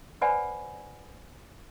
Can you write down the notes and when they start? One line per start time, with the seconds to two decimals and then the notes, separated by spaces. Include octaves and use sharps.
0.21 B4 C5 D5 F#5 G#5 B5